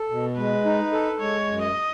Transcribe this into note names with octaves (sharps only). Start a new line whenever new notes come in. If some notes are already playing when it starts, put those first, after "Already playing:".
Already playing: A4
B2
G#3 B4
D#4
A4
G#3 C#5
F#2
D#5